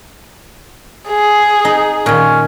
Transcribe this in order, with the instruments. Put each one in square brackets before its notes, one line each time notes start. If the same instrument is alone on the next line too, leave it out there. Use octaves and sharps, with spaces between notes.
[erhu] G#4
[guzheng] D#4
[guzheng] A#2 D#3 [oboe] C#4